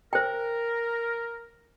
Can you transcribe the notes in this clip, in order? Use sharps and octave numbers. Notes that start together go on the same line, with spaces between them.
A#4 C5 G5